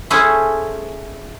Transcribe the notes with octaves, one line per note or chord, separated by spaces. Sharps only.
C#4 E4 G#4 A4 C5